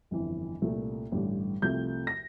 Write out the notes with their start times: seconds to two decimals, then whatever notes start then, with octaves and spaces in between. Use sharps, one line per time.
0.11 G1 F2 E3
0.62 C2 A#2 A3
1.12 A1 G2 D3 G3
1.62 C2 C3 F3 A3 G6
2.07 A#6